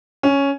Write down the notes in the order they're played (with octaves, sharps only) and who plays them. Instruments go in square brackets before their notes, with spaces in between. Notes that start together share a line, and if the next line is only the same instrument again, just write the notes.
[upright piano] C#4